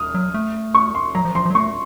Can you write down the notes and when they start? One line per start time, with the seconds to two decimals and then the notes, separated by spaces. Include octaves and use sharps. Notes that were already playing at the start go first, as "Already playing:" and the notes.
Already playing: D#6 F6
0.14 F#3
0.34 A3
0.75 C#6
0.95 C6
1.15 F#3 A#5
1.25 F3
1.35 F3 C6
1.45 F3
1.50 F#3
1.55 A3 C#6